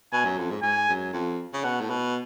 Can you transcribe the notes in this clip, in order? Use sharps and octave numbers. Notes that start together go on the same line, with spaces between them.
B2 G#5
F#2
F2
G#2
G#2 G#5
F#2
F2
C#3
B2 F#5
A2
B2